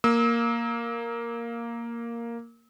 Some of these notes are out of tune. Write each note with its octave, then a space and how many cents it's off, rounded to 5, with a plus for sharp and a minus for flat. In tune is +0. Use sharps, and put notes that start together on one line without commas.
A#3 +0 E6 -35